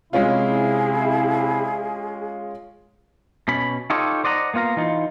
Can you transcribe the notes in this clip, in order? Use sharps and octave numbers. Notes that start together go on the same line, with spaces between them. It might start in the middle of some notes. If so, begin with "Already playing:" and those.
C3 G#3 C#4 E4 F4 G#4
B2 C#4 B5
D#4 F4 G4 A4 C#5 D#5
C5 D5 D#5 F#5 A#5
A#3 B3 F4 F5 A#5
E3 D#4 F4